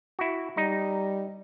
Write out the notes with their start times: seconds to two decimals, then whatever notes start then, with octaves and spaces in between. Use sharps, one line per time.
0.19 E4 F#4
0.57 G3 D#4